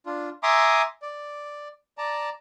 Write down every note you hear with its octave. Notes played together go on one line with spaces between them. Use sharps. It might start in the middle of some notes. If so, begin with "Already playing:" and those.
D4 F4
E5 G#5 A#5 C6 D6 D#6
D5
D5 A5 A#5